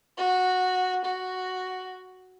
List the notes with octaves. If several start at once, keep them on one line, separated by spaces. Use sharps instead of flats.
F#4
F#4